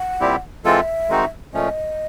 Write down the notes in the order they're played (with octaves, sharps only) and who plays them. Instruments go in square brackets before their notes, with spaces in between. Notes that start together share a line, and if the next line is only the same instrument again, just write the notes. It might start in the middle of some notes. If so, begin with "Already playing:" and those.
Already playing: [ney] F#5
[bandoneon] A#2 G3 C4 E4 G4
[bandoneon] E3 G#3 C4 F4 A4 [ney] E5
[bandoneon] D#3 G#3 C4 D#4 F#4
[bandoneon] A#2 F3 A3 C#4 [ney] D#5